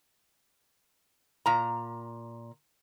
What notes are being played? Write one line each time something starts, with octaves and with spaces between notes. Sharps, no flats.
A#2 A#5